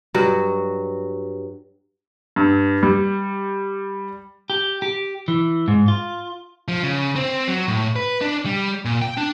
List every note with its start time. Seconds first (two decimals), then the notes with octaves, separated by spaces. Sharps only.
0.14 G2 F#3 F#4
2.36 G2
2.83 G3
4.50 G4
4.82 G4
5.28 E3
5.68 G#2
5.88 F4
6.68 F3
6.83 C#3
7.16 C4
7.48 F#3
7.68 A2
7.96 B4
8.21 D4
8.46 G3
8.85 A#2
9.02 G5
9.17 D4